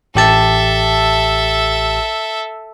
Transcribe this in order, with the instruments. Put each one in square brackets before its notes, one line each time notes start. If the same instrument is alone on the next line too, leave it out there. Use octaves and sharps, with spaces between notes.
[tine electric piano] A1 G4 A5 [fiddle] A4 E5